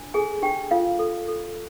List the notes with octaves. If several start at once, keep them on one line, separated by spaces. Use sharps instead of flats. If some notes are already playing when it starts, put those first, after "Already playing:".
Already playing: D4
G#4 A4 G#5
D4 G4 G5
F4 A4 F5
A4
A4